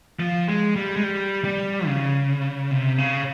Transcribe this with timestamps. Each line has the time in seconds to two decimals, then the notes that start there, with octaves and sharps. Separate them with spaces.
0.20 F3
0.48 G#3
0.76 G3
0.96 G#3
1.04 G3
1.44 G3
1.86 C#3
2.71 C3
2.98 C#3